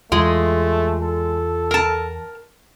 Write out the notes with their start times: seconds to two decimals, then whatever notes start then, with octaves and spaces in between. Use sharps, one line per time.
0.12 E2 G#3 A3 F4
1.02 A4
1.71 A#4 A5